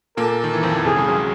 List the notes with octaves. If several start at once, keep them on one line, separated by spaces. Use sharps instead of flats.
A#2 A#3 A4
D#3
E3
F2 F3
E2 E3
C3 G#4
C#2 C#3
F#2 F#3